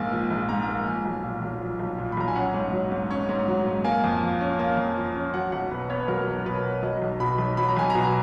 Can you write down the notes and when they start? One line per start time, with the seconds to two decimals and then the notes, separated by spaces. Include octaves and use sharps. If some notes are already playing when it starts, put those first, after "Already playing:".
Already playing: A#1 G#2 A#3 G#5
0.12 F3
0.31 A#1
0.49 G#2 A#5
0.68 A#3
0.87 F3 G#5
1.05 B1
1.24 A#2
1.42 B1
1.61 F3
1.79 B1
1.98 A#2
2.12 B5
2.17 B1 A#5
2.28 G#5
2.36 C#4 F#5
2.54 G#2
2.72 F#3
2.92 G#2
3.10 C#4
3.29 G#2
3.48 F#3
3.67 G#2
3.84 A#3 G#5
4.04 F2
4.22 F3
4.41 C#4
4.59 A#3
4.77 F2
4.97 F3
5.15 C#4
5.34 F#3 F#5
5.52 B1 F#5
5.71 B2 B4
5.90 B3 C#5
6.08 F#3 A#4
6.27 B1
6.46 B2 B4
6.65 B3
6.83 F#3 D#5
7.02 B1
7.20 B2 B5
7.38 B1
7.57 F#3 B5
7.68 A#5
7.77 B1 G#5
7.90 A#5
7.95 B2